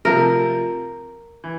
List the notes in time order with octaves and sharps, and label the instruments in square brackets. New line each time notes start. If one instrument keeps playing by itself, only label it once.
[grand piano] C3 F3 A3 [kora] A#4
[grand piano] E3